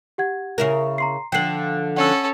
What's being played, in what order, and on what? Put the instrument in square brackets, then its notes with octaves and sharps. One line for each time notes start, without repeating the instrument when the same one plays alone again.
[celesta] G4 F#5 G#6
[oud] C#3 E4 A#4
[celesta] A#5 C6 C7
[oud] D3 F3 [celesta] G5 C7 F#7
[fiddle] C#4 A4 [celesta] F#5 E6